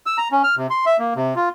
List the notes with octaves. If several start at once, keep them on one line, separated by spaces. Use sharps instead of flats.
E6
A#5
C#4
F6
C3
C6
E5
A#3
C3
F4